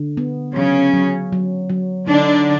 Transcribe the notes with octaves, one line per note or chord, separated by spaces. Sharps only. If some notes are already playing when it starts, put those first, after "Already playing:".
Already playing: D3
B3
C#3 F#3 C#4
F#3
F#3
F#3
D3 D4 D#4